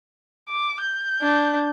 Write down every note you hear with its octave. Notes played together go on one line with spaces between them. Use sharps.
D6
G6
D4